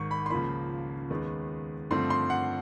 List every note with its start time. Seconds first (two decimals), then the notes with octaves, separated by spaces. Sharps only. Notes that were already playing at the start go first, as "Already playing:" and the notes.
Already playing: G#1 G#2 D#3 C#6
0.11 B5
0.26 C6
0.30 C#2 C#3 F3 A#3 B5
1.10 D#2 D#3 G#3 B3
1.91 G2 D3 F3 A3 C4 C6
2.10 C6
2.30 F#5